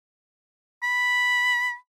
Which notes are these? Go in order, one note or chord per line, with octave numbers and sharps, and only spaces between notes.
B5